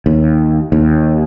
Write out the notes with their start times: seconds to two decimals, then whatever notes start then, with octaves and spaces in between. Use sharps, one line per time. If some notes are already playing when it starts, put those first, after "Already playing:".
0.06 D#2
0.72 D#2